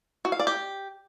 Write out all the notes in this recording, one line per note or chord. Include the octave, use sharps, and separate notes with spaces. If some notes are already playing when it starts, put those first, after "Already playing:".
F#4
F5
D5
G4